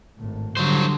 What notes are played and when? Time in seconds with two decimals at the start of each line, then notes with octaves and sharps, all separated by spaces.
0.17 G#1 A2
0.57 D3 F#3 G3 C5